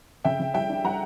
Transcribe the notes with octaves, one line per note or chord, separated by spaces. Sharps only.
C#3 E5 G5
C#3
G3 E5 G5
D4
G3 F#5 A#5